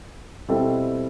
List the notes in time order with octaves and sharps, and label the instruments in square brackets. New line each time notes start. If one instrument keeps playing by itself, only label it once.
[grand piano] B2 G3 C4 E4 A4